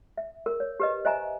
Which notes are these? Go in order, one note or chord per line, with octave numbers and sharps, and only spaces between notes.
E5
A#4
C#5
G4 B4 D#5
C5 D#5 E5 G#5 A#5